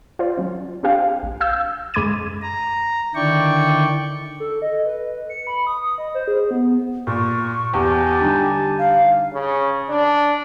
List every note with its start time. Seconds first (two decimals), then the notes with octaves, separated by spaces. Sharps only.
0.19 F4 C5 D5
0.37 F#3 C#4
0.83 C4 D4 G4 F5 G5
1.23 A#1
1.41 F5 E6 G6
1.94 F#2 G#3 B5 D6 G#6 D#7
2.42 A#5
3.15 D3 D#3 E4 D5 G5 C#6
4.40 A4
4.62 D#5
4.86 B4
5.29 C#7
5.47 B5
5.67 D#6
5.98 D#5
6.15 C5
6.28 G#4
6.51 B3
7.07 A#2 C#6
7.74 E2 G4 G#5 A5
8.20 D3 G3 D#4
8.79 F5
9.34 C#3
9.90 D4